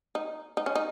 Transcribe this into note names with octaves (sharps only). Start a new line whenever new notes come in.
D#4
D#4
C#4
D#4